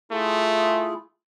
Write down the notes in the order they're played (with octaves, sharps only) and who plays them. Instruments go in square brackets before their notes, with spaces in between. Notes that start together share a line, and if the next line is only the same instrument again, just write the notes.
[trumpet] A3 [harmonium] E4 F4 G#4